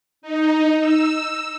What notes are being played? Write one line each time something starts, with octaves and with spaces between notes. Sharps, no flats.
D#4
E6